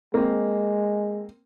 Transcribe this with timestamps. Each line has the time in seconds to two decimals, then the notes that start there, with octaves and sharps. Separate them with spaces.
0.14 G#3 A#3 C4